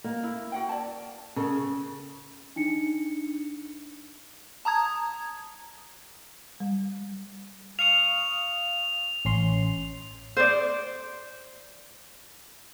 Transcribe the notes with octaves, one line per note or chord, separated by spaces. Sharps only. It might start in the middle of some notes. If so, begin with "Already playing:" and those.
A#3
E4
F#4 F#5 G5
D5 A5
C#3 A4 A#4
D4 D#4 C#7
A5 A#5 D#6 G#6
G3
F5 C#6 D#6 F7
A1 C#4 C6
C5 D5